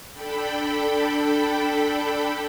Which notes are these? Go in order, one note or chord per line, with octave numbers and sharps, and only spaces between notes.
D4 A4 G5 B5